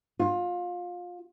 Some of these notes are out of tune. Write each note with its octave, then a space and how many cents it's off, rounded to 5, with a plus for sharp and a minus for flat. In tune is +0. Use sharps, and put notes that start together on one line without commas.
F4 +25